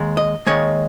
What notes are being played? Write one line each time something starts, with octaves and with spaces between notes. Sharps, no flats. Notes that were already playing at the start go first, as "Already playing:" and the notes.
Already playing: D#2 D#3 G#3
D#5
D#2 D#3 G#3 C#5